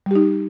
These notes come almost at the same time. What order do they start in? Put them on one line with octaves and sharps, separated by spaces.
G3 G4 D#4